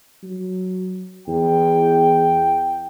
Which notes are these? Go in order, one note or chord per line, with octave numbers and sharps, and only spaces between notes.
F#3
E2 G5